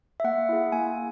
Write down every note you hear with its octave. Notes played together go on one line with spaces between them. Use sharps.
E5
A#3 F#5
E4 G#4
A#3 G#5